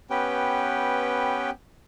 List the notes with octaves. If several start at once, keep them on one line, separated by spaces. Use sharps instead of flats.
B3 C#4 G4 B4 G5